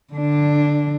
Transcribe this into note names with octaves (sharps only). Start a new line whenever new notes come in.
D3 D4